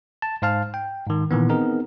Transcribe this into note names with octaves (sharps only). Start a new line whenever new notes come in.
A5
G#2 C5 F5 A5 F6
G5
G#2 D#3
A#2 D#3 E3 B3
B3 C4 D#4 G#4 A#4